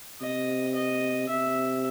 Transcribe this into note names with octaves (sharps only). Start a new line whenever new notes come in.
C3 D#5
D#5
C3 E5